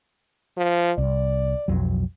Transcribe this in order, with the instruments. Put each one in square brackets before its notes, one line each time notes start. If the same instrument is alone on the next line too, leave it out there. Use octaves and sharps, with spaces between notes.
[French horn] F3
[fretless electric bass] C2 [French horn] D5
[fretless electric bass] B1 F2 F#3